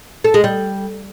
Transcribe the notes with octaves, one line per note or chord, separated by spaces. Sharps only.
A4
G#3
G3